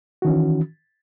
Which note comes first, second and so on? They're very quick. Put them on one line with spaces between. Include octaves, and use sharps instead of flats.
F#4 D#3 C#4 E3